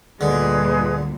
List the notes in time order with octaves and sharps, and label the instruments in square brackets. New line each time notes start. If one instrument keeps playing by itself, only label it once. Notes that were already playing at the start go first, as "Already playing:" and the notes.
[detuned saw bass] D2 [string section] G2 A#2 [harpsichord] D3 [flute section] G#4 B4 D#5